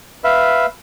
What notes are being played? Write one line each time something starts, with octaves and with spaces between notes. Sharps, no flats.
B4 E5 F5